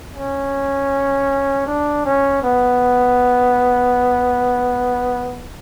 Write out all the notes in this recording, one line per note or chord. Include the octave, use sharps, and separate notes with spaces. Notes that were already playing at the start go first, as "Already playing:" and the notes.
C#4
D4
C#4
B3